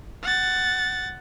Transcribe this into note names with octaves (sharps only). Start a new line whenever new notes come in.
F#5 A6